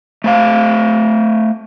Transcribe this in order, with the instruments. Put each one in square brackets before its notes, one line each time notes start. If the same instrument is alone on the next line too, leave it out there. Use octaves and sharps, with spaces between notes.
[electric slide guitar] A3 C5 F5